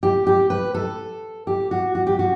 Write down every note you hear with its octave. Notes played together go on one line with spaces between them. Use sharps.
G4
G4
B4
A4
G4
F#4
F#4
G4
F#4